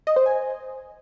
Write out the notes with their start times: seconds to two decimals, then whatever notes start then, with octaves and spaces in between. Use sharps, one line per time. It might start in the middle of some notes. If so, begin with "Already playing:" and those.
0.07 D#5
0.16 C5
0.26 G#5